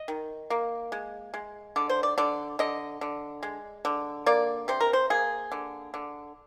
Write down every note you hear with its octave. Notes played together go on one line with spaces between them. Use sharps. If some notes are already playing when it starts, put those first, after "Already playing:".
Already playing: D#5
D#3
A#3
G#3
G#3
D3 D5
C5
D5
D3 D5
D3 D#5
D3
G#3
D3
A#3 D5
C3 C5
A#4
C5
A#3 G#4
D3
D3